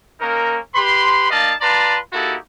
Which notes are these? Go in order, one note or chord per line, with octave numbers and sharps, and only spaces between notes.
A#3 C#4 D#4 A#4
G4 B4 B5 C6
A#3 D#4 D5 D#5 F5 A5
F4 B4 D5 A5 A#5 C6
A#3 D#4 E4 F#4 G4 A4